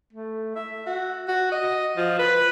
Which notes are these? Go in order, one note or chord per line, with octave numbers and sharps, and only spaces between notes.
A3
E5
F#4
F#4
D#5
F3
B4